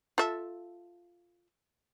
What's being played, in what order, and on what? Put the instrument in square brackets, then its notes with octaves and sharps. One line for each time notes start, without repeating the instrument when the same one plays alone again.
[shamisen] F4 A4 E5